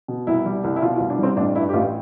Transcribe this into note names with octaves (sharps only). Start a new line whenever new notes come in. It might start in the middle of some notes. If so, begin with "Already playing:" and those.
B2
C2 E4
G3
C2
E4
B2 F4
F4
C2
D4
G3 C4
A1 D4
G2 E4
G4
A1 F4